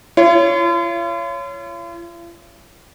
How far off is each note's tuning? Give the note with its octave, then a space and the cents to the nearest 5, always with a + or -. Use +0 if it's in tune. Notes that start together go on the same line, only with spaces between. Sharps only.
F4 -45 C#5 +10